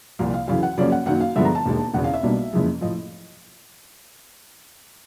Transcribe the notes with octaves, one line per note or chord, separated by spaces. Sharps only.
C2 A#2 F3 A#3
F5
F#2 C#3 E3 F5
F#5
F#2 C#3 F3 A#3 C#4 D5
F#5
F#2 D#3 F#3 A#3 F#5
F5
G2 D3 F3 G#3 B3 E5
A#5
A5
E1 D#2 D#3 G#3
E1 E2 C#3 F#5
F5
E5
B1 B2 G3 A#3 D4
F#1 F2 C#3 E3 G#3
A2 F3 D#5